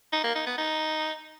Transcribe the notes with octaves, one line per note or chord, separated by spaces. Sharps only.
D#4
A#3
D#4
B3
D#4